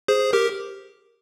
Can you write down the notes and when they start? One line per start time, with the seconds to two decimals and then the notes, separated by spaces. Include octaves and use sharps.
0.08 G#4 C5
0.33 G4 A#4